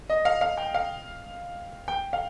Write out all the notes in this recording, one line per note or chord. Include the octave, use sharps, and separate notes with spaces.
D#5
F5
F5
G5
F5
G5
F5